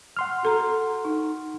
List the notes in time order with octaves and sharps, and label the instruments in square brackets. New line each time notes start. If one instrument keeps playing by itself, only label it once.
[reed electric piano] F#5 C6 F6
[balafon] F#4 A4 A#5
D#4